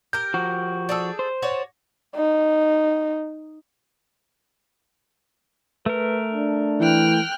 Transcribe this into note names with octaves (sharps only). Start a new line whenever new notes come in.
G4 A#4 G6
F3 F#4
D4 G#4 A4
C5
F#4 C#5 D5
D#4
A3 A#4 B4
D4
E3 G5 F6 F#6